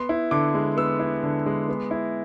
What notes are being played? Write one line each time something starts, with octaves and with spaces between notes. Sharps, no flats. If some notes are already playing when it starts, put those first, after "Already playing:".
Already playing: B3 C6
E4
D3 D6
G#3
B3 E6
E4
D3
G#3
B3
E4